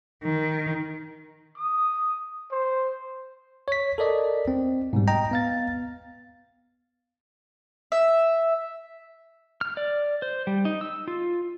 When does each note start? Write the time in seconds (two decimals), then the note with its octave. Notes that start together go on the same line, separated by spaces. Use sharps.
0.24 D#3
1.56 D#6
2.51 C5
3.68 C#5 B6
3.98 A4 A#4 D5 D#5
4.48 C4
4.93 G#2 B2 G3
5.08 D#5 G5 A#5
5.31 B3 F5 A6
7.92 E5
9.61 F6
9.77 D5
10.22 C5
10.47 G3
10.65 D#4
10.81 E6
11.08 F4